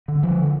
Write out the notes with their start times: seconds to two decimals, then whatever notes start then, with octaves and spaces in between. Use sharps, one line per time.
0.08 D3
0.23 D3 F3